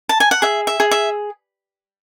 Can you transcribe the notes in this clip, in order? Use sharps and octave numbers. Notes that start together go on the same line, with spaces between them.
A5
G#5
F#5
G#4 E5
E5
G#4
E5